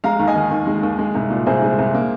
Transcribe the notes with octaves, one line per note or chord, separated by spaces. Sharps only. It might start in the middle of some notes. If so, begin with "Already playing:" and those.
G#3 F5 A#5
D#2
D#5 G#5
D#3
D#2
G#3
D#2
G#3
C2
A#2
C2 G#4 C5
G#3
C2
A#3